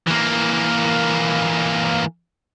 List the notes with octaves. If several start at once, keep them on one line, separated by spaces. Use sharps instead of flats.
E3 A#3